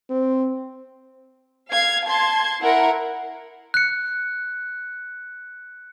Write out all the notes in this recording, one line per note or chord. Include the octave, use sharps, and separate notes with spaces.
C4
F5 G#6
A5 C6 G#6
E4 A#4 F#5
F#6 C#7